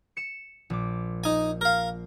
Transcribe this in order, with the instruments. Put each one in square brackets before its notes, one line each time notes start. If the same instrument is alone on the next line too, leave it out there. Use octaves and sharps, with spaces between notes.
[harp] C#7 E7
A#1 D6
[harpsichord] D#4 G#5
A#4 F5